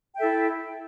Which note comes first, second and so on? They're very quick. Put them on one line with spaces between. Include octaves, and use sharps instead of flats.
G5 E5 A4 E4